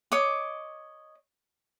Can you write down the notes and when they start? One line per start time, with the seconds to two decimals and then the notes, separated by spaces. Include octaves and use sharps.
0.12 C#5 D#5 D6